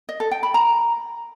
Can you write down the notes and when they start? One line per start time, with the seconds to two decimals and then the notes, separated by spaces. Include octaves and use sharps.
0.09 D#5
0.20 A4
0.31 G5
0.43 B5
0.54 A#5